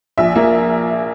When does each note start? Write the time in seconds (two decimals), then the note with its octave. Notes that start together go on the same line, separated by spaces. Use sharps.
0.18 A#1 E5
0.36 A#3